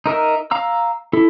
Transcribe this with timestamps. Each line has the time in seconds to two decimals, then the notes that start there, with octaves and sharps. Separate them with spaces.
0.06 D#4 A#4 E5
0.51 F5 A#5 E6
1.13 E4 A4